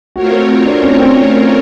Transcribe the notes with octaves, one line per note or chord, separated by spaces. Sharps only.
A3 C4 F4 F#4 A#4 C#5
D4
C#4
C4